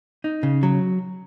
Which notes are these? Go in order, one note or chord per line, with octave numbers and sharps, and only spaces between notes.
D#4
C#3
F#3